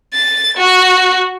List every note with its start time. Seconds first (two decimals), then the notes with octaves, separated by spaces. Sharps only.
0.13 A6
0.57 F#4